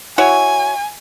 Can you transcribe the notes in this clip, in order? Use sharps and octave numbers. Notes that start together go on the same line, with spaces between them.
E4 F#4 C#5 G#5